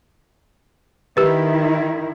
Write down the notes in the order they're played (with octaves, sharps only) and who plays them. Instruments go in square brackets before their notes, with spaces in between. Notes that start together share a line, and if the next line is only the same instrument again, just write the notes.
[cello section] D#3 E4 [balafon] G4 B4